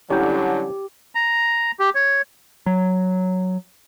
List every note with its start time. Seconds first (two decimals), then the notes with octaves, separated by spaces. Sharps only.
0.10 D3 F#3 G3 C#4 E4 G4 A#5 G6
1.15 A#5
1.80 G4
1.95 C#5
2.66 F#3